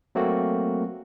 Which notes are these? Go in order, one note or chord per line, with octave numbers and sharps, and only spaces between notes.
F#3 A3 A#3 C4 F#4